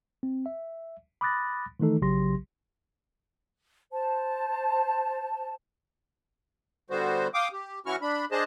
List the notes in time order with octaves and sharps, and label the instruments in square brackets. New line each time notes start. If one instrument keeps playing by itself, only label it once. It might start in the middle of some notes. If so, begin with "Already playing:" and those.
[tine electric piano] C4
E5
B5 D6 D#6 F#6 A6 A#6
D#3 E3 A3 D#4 A4
A#1 C#3 F#3 G4 C6 A#6
[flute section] C5 A5
[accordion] D3 G3 B3 F#4 C5
F5 G5 D6 D#6
G4
E3 C#4 E4 F#4 C#6 F6
D4 B5
D4 G#4 C5 D#5 A5